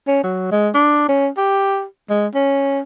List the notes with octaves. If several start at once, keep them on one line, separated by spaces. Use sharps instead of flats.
C#4
F#3
G#3
D4
C#4
G4
G#3
C#4